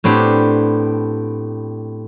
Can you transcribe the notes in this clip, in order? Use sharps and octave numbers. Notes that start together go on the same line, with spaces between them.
A2 B3 C4 D4 G4